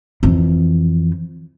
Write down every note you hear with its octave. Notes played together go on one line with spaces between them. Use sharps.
F2 E3